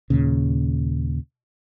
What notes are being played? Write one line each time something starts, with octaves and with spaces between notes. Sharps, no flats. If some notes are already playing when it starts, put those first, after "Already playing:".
D#2 A#2 C#3